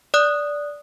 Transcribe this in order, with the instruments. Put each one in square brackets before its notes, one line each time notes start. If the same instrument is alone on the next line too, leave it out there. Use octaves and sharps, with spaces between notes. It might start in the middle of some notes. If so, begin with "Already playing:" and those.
[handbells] D5 D#6 F#6